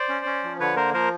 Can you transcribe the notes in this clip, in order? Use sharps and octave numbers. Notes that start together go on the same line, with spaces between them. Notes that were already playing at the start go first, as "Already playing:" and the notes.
Already playing: C5 D5
C#4
C#4
F3
D3 B4 C#5
A#3 A#4 C5
F3 A#4 C5